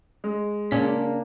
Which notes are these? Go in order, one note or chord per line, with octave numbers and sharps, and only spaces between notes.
G#3
A#2 C#3 A#3 C#4 D4 B6